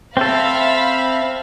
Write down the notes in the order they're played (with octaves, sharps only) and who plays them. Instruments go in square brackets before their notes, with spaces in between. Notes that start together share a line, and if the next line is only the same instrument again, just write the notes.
[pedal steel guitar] C4 A4 [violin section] E5 F5 B5